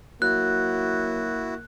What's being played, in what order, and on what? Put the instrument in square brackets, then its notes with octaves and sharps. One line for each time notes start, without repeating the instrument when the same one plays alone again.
[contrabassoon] F#3 [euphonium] A#3 [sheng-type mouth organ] E4 F#4 [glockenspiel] F#6